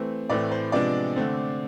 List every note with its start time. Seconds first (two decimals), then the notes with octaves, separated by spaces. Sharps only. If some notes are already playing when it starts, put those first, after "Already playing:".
Already playing: E3 A3 C4
0.29 A2 E3 A3 C4 D5
0.51 C5
0.72 C3 F3 G#3 B3 D4 D5
1.16 D3 A3 C4